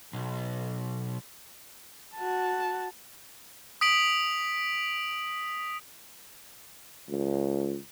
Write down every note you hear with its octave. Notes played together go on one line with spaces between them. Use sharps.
B1
F#4 A5
D#6 B6 D7 F#7
C#2